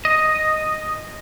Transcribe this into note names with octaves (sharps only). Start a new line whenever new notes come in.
D#5